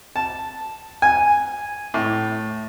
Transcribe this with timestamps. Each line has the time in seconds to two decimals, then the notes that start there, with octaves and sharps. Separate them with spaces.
0.16 A5
1.02 G#5
1.94 A2